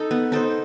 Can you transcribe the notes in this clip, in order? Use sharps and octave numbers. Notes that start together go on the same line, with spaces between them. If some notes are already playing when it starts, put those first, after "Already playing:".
Already playing: D#4 A4
B3
D#4 A4 C5